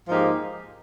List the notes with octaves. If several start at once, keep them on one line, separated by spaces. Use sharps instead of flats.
G#2 F3 A#3 D#4 G4